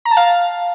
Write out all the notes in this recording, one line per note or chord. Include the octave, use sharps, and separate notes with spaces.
A#5
A5
F5